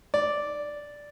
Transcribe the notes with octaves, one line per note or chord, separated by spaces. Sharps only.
D5